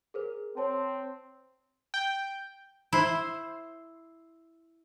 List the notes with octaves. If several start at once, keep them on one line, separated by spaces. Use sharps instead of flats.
G#4 A#4 C5
C4 C#5 A5
G5
E4 C5